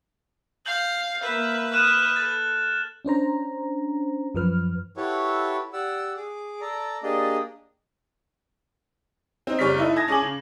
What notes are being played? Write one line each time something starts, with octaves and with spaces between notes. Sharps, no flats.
F5 G6 F#7
A#3 B4 E5
D#6 F6 F#6 E7
A4 A6
C#4 D4 C5 A#5
F#2 F3 B4 F6
E4 F#4 G4 A4 B4 C#5
G4 D5 F#5 E6
G#4 D6
A4 D5 A#5
A#3 D4 G4 G#4 D5 D#5
C4 D#4
F#1 G3 C#5 D5 F6 B6
D#4 E4 A4
A5 D#6 G#6 A#6
C#4 G#4 D6 F#7
C#3